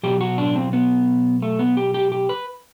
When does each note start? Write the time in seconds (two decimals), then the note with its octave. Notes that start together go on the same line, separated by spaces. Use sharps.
0.03 B2 F#3 G4
0.21 F#4
0.38 D4
0.56 C4
0.73 B3
1.42 A3
1.59 B3
1.77 G4
1.94 G4
2.12 G4
2.29 B4